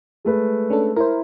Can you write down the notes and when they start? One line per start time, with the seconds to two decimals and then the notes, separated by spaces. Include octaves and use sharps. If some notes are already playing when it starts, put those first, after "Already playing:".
0.25 G#3 A3 B4
0.70 C#4 D4 A4
0.96 E4 A#4 C5